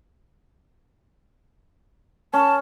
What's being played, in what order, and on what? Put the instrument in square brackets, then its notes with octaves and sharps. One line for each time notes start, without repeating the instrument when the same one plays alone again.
[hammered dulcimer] C#4 [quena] A5